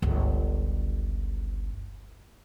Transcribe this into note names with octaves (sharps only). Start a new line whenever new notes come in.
G1 C#2